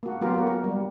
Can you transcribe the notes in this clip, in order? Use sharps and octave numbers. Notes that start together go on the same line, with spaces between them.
A#3 F#4
F#3 A#3 B3 F4 G4 A#4
A#3 F#4
A#4
G3